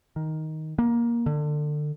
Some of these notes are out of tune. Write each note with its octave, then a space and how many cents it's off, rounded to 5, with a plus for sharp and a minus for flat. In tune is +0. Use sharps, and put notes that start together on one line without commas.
D#3 +10
A#3 +15
D3 +25